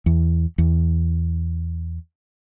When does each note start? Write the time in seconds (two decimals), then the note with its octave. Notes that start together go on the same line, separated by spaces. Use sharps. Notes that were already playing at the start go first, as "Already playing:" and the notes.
0.06 E2
0.58 E2